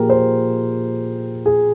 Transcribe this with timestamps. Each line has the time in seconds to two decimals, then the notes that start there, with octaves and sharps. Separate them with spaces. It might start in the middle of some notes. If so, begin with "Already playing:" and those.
Already playing: A#2 F3 A#3 G4 G#4 A#4
0.10 C5
1.46 G#4